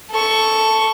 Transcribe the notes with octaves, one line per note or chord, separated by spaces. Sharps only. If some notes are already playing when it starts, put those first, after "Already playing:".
A4 C#6